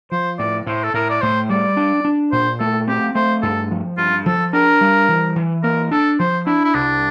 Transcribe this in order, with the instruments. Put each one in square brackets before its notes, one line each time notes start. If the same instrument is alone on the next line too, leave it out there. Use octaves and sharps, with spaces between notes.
[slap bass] F3 [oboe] C5
[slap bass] A2 [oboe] D5
[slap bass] A2 [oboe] C5
[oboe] A4
[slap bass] A2 [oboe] A#4
[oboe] D5
[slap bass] A2 [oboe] C5
[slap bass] G3 [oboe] D5
[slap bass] D4
D4
[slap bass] A#2 [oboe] C5
[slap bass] A3 [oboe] A4
[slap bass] C4 [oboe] G4
[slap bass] A3 [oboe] C5
[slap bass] G2 [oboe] A4
[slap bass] F3
[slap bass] G2 [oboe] F4
[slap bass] F3 [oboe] A4
[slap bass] D4 [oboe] A#4
[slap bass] G3
E3
E3
[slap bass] A#3 [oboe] A#4
[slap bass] D4 [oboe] A4
[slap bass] F3 [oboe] C5
[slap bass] D4 [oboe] E4
[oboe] E4
[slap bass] C2 [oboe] D4